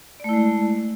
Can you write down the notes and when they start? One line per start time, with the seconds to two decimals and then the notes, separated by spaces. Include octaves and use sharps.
0.20 D5
0.24 A3
0.29 E4
0.33 G#3